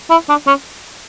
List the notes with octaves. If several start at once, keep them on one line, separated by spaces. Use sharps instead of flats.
E4
D4
C#4